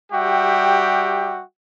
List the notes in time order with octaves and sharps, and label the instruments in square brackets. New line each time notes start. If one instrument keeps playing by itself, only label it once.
[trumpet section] G3 F#4 G4 E5 G5